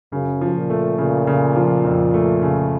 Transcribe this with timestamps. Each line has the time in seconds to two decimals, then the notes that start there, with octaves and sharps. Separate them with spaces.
0.12 F#2 C#3
0.41 F3
0.55 A#2
0.70 A3
0.98 A#2 C#3
1.27 C#3
1.56 F3
1.85 F2
2.14 A3
2.42 C#3